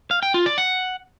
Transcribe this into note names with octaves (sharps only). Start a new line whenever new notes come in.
F5
G5
F4
D5
F#5